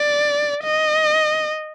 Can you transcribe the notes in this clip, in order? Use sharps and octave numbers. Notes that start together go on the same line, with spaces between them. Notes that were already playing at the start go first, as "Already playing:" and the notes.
Already playing: D5
D#5